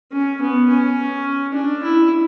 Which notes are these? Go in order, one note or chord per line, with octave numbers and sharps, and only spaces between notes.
C#4
B3
C#4
D4
E4